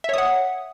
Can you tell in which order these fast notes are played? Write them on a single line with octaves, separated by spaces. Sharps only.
E5 C#5 D#6 F#5